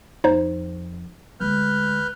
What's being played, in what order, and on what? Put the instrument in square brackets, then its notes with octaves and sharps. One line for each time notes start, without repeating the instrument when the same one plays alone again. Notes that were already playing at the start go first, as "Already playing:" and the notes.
[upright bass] F2 [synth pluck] D#4 C5
[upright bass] D2 G#3 [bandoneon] B4 F6 G6